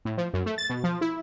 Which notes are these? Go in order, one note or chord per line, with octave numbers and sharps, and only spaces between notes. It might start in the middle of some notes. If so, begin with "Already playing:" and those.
A2
F3
F#2
A3
A6
B2
F3
E4